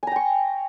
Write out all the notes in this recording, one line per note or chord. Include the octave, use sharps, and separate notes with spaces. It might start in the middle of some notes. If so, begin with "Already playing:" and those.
G5 G#5 A#5 C#6